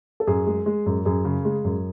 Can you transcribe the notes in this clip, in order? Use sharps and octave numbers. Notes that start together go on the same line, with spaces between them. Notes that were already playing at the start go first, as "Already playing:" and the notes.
A4
F#2 G#4
G#3
G#3
F#2
F#2 G#4
C#3
G#3
F#2